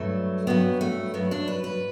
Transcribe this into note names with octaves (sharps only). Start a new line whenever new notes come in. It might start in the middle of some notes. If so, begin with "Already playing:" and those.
Already playing: G2 F#3 A3
G2 F#3 B3
A3
G2 F#3 B3
D4
B4
B4